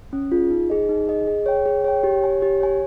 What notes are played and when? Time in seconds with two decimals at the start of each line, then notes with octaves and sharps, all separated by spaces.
0.13 C#4
0.32 F4 G#4
0.50 D#4
0.70 G#4 D#5
0.89 D#4
1.08 G#4 D#5
1.27 G#4
1.46 C#5 G5
1.66 G#4
1.84 C#5 G5
2.03 G4
2.23 C#5 G#5
2.42 G4
2.60 C#5 G#5